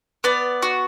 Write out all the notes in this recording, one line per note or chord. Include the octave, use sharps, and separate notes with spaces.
B3 D5
F#4